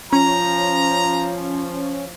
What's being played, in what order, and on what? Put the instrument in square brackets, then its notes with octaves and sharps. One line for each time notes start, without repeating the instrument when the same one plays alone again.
[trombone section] F3 [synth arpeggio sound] C#4 [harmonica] A#5